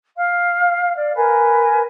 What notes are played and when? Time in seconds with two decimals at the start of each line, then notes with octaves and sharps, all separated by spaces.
0.17 F5
0.96 D5
1.15 A#4 B4 G#5